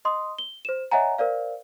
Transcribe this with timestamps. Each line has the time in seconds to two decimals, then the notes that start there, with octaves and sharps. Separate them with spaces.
0.05 D#5 C6 D#6
0.39 G7
0.65 C5 E7
0.91 C#5 D#5 E5 F#5 G#5 A#5
1.18 A#4 C5 D5 F5